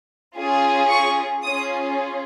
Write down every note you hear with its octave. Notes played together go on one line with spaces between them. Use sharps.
C#4 F4 G#4
C#6
C#4 F4 G#4 D#6